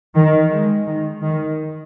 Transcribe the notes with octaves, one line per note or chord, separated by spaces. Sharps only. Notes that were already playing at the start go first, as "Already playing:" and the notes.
D#3
G#3
D#3
D#3